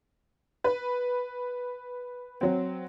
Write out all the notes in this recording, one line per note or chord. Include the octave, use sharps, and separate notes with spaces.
B4
F#3 C4